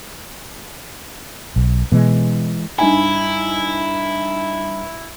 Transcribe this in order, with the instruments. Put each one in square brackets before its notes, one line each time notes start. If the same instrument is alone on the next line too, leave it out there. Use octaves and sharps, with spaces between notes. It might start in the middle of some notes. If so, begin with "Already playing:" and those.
[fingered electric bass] B1
[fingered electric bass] B2 B3 [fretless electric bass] E3 G#3
[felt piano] G2 D#4 G#5 [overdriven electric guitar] E4